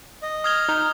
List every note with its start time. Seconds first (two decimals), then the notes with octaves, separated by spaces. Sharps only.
0.23 D#5
0.44 D#6 F6 G#6 G7
0.68 D#4